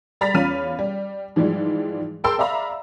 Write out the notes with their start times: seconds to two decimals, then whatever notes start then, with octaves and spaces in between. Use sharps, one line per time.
0.21 G3 A#5 B5 A6 B6
0.34 E2 C#4 F4 B5 F6 D#7
0.79 G3
1.36 G#2 E3 F3 G3 G#3
2.24 G#4 A#4 G5 A5 C6 E6
2.38 D5 E5 F5 A#5 B5